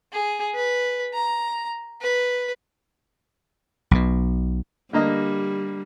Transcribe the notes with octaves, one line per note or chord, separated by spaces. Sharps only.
G#4
B4
A#5
B4
B1 B2
D3 G3 A#3 D#5